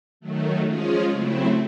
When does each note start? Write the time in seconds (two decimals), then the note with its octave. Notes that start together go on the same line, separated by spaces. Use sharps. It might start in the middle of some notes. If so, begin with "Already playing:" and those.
0.20 D#3 F#3 A3
0.65 F3 G#3 C#4 F4 G#4
1.10 C#3 F#3 A3 C4 E4